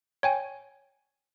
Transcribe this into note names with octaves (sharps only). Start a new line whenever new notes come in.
C#5 G5 G#5